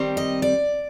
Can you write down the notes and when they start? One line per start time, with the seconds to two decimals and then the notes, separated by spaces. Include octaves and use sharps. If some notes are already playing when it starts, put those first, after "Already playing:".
Already playing: D#3 G3 C4
0.17 D#5
0.42 D5